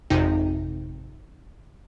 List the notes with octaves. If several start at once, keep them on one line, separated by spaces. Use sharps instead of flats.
G#1 F2 C3 D#4